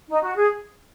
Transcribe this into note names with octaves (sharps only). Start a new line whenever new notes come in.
D#4
F#4
G#4